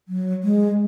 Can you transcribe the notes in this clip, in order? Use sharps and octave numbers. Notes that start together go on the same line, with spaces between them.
F#3
G#3